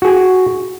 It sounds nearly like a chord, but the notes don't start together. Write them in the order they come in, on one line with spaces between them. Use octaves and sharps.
F#4 G#4 G#5